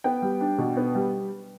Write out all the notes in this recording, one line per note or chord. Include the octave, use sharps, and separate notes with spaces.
B3 G5
G3
D4
B2
B3
G3